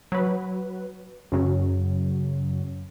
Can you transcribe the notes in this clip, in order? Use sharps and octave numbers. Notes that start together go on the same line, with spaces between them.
F#3 B4
F#2 C#3 F#3